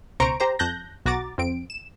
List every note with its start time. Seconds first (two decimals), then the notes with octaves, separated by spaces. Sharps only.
0.20 C#2 B2 C5 A#5 C#6 D7
0.40 G4 C5 A#5
0.59 F2 A5 F#6 G6 A#6
1.05 B1 F#4 A#5 D6 A6
1.38 F2 C4 D7
1.70 E7